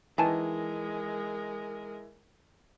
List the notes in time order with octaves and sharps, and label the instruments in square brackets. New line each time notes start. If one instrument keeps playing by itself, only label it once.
[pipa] D#3 G#5 A5 [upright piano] E3 [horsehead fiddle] G#3 A#4